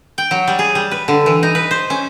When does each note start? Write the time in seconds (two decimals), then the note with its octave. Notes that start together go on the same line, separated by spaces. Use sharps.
0.18 G5
0.31 F#3
0.47 G3
0.59 G#4
0.75 G3
0.91 B4
1.08 D3
1.26 E3
1.43 D#4
1.55 B4
1.71 C5
1.90 C#4